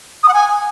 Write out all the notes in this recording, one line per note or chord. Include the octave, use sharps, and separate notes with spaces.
D#6
F#5
G#5